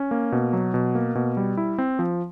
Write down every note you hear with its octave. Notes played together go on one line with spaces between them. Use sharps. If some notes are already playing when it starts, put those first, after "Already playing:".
Already playing: C#4
A#3
B2
F#3
B2
A#3
B2
G3
E4
C4
F3